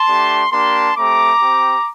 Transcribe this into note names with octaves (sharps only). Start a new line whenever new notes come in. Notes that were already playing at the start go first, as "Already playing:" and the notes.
Already playing: A5 C6
A3 D4 G4
A#3 D4 G4 A5 C6
A3 C4 G4 A#5 D6
C4 G4